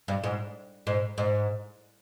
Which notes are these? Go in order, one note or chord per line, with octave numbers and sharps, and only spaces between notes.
G2
G#2
G#2
G#2